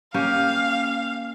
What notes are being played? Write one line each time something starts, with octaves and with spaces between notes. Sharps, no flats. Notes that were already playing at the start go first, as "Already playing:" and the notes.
A#3 C#4 G4 F5